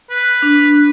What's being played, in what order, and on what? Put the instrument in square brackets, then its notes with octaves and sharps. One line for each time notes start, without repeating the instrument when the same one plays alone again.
[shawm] B4
[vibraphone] D4